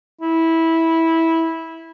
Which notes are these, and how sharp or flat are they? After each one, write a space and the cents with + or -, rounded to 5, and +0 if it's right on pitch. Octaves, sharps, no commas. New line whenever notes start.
E4 -15